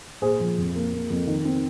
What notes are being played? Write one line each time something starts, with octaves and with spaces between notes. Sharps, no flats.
A#2 G#4 C5
F3
F2
A#3
A#3
F2
D#3
C4